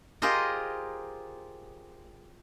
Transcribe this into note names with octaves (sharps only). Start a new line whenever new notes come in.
F4 G4 G#4 A#4 C5 D#5